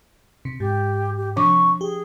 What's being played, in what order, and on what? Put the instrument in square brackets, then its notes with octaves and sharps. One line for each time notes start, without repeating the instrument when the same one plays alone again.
[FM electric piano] C3
[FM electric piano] G#2 [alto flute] G4
[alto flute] G4
[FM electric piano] C3 [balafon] F3 D4 D6 [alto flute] C#6
[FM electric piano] G4 [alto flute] G#4